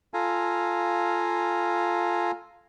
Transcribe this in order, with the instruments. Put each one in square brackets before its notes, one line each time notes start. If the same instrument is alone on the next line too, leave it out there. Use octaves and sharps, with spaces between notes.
[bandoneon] F4 A4 F5 G#5 A#5